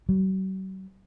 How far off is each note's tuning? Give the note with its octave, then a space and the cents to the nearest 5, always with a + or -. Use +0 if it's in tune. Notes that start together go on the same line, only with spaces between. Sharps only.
F#3 +45